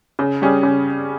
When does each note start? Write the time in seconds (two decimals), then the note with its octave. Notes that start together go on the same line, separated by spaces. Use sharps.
0.19 C#3
0.42 G3 C#4 G#4
0.63 C#3